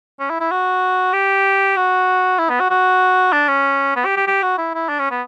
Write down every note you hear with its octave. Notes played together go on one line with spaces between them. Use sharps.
C#4
E4
E4
F#4
G4
F#4
E4
B3
F#4
F#4
D4
C#4
B3
G4
G4
G4
F#4
E4
E4
D4
C#4
B3